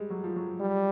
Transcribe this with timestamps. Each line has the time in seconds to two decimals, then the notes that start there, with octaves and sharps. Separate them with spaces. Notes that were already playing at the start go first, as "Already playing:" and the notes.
Already playing: G3 G#3
0.10 F#3
0.24 F3
0.36 F#3
0.60 G3